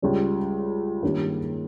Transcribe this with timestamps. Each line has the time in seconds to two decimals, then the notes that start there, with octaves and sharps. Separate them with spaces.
0.02 C#2 C#3 G3 C#4
1.03 G2 D#3 A#3 C#4 G4